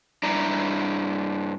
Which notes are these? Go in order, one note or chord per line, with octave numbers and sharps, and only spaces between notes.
G2 D4 E4 A#5